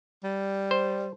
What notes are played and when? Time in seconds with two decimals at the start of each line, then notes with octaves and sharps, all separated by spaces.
0.24 G3
0.71 C5